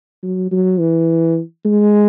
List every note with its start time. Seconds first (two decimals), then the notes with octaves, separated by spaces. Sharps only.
0.23 F#3
0.51 F#3
0.80 E3
1.65 G#3